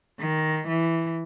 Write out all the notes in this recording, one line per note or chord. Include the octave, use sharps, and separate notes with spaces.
D#3
E3